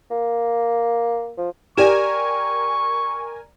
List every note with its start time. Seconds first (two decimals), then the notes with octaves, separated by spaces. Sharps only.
0.10 A#3
1.37 F3
1.77 G4 A#4 D5 G#5 C#6 E7